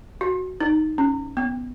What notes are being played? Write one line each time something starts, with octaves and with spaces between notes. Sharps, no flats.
F#4
D#4
C#4
B3